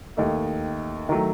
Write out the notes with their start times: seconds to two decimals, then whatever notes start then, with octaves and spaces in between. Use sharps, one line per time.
0.17 D#2 D#3 A3 D#4
1.09 D#3 F#3 A3